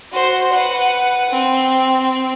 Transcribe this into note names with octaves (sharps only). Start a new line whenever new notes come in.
F#4 C5
B4 F#5
C4